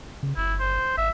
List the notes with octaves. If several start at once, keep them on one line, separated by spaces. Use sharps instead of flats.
C#3
G1 E4
C5
G#1 E5